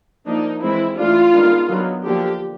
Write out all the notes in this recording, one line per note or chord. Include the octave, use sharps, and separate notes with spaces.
F3 A#3 D4 D#4
E3 G#3 C4 E4
E3 A3 D4 F4
D#3 G#3 B3 D4
D#3 F#3 B3 D4
D3 F3 A#3 D4 G4